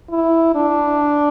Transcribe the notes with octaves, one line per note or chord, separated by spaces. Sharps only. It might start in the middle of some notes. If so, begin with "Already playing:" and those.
E4
D4